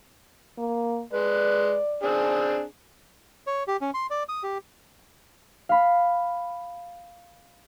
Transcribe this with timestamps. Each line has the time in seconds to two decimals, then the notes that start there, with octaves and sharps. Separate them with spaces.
0.58 A#3
1.13 G#3 B4 D5
2.03 C4 D4 G#4
3.47 C#5
3.68 G4
3.81 C#4
3.94 C6
4.11 D5
4.29 D#6
4.43 G4
5.69 F5 B5